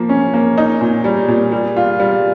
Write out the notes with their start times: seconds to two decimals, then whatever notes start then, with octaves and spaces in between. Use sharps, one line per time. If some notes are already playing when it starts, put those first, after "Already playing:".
Already playing: F3 A#3
0.09 C#4
0.34 A#3
0.58 D#4
0.81 A#2
1.04 G3
1.28 A#2
1.52 G3
1.76 F4
2.00 G3